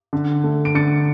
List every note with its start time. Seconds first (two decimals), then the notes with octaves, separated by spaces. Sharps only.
0.13 D3
0.44 A3
0.65 D7
0.75 D3 A6 C#7